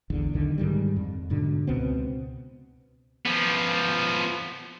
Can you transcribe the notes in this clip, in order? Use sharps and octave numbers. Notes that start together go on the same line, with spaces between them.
A#1 E2 D3
B1 D3 D#3
G#2 D#3 G3
F2
G#2 B2 D3
C#2 B2 B3 C4
F3 B3